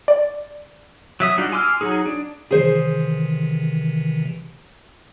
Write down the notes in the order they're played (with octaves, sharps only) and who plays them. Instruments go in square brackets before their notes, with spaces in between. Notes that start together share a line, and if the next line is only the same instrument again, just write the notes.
[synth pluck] D5
[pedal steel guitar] F#3 E5 D#6
G3 D4 D#4 F4 F#4
G#5 C6 D6 E6 F6
F#3 D#4 G#4
D4
[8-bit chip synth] C3 D#3 E3 [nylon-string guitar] G#4 C5